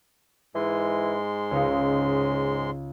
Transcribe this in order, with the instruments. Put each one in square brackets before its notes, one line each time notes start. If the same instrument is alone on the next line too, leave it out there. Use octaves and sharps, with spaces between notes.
[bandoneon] G#2 G#3 C6 [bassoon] E3
[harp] C#2 D#4 [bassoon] C#3